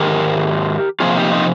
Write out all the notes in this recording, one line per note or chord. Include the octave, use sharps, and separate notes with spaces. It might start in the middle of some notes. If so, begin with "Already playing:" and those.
Already playing: G#2 D#3 G#3 G4 A#4
C3 F3 A#3 F4 G#4
D#4 G4
C4 D#4